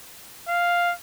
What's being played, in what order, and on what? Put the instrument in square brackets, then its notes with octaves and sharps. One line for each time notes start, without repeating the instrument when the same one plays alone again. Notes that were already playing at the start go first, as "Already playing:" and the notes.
[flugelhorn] F5